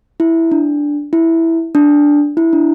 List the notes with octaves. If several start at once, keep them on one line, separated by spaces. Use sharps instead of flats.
E4
D4
E4
D4
E4
D4